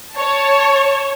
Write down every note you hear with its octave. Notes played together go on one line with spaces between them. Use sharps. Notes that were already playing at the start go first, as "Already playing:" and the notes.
C#5 A5